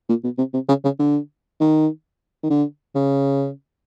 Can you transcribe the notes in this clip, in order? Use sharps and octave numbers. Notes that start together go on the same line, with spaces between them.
A#2
B2
C3
C3
C#3
C#3
D3
D#3
D#3
D3
C#3